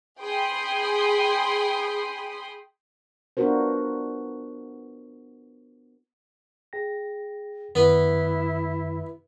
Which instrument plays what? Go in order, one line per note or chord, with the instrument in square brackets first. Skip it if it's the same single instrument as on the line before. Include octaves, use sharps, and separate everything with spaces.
[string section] G#4 G5 B5 C6 D#6
[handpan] B3 D4 F4 F#4 A#4 C5
[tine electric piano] G#4 G5 A#6
[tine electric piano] F#2 D#3 [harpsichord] B3 B4 [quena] E4